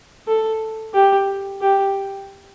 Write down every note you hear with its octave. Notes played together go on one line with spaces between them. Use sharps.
A4
G4
G4